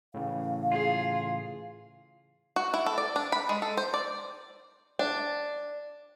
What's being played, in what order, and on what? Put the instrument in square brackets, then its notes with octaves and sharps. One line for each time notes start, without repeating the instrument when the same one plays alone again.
[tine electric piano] A2 C#3 E3 [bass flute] F5
[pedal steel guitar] F4 [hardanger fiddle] G#4
[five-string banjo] F#4
E4
A4
D5
D4
B5
G#3
A4
C5
D5
D4